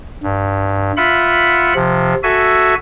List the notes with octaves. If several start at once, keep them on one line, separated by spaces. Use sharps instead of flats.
G2
F4 E5 F#5 B5
C3 F3
F#4 A4 E5 G#5